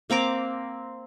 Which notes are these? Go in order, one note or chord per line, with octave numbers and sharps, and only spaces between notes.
A#3 C4 A#5 D6